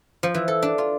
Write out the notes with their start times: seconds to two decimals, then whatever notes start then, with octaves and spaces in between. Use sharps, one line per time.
0.23 F3
0.34 E3
0.48 A4
0.62 D4
0.78 F4